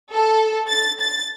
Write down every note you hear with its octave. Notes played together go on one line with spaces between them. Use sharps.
A4
A6
A6